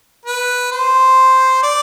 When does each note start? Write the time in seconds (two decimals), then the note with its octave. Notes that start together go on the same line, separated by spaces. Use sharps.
0.26 B4
0.72 C5
1.63 D5